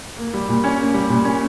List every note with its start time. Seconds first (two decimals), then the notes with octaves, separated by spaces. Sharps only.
0.17 A#3
0.33 G3
0.48 A#2
0.64 C#4
0.79 A#3
0.94 G3
1.09 A#2
1.25 C#4